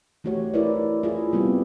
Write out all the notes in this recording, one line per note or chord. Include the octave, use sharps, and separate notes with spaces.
E3 A3 F#4 G4 C#5
E4 A#4 B4 D5
E4 F4 G#4
G3 B3 C4 G4